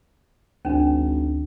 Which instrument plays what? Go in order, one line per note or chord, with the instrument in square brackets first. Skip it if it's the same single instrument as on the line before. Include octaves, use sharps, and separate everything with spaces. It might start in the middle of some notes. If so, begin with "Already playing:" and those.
[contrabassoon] G#1 [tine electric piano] D2 [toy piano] C#4 D4